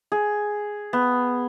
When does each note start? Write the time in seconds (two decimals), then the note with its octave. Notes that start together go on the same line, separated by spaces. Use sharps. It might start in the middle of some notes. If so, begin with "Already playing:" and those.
0.12 G#4
0.93 B3